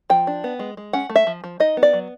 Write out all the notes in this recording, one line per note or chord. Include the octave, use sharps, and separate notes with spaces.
F3 G5
D4
B3
G#3
G#3
C#4 F#5
A3
E5
F3
F3
D#4 D#5
B3
D5
F#3